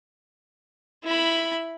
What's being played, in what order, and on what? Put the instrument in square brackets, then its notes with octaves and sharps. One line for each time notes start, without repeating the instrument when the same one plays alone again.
[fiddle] E4 B5